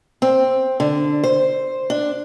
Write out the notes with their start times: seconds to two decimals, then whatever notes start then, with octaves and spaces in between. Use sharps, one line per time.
0.22 C4
0.80 D3
1.24 C5
1.90 D4